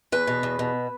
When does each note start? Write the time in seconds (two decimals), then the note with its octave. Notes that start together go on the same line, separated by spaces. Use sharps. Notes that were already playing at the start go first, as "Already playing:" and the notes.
0.12 E2 B4
0.27 B2
0.43 E2
0.59 B2